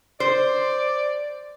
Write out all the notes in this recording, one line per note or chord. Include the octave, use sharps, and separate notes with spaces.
C5 D5